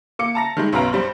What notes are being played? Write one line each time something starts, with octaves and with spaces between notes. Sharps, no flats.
A#3 D6 C#7
A5 A#5 A#6
D#3 G3 G#3
B1 F#2 B4 F5 A#5 D7
G2 G3 C5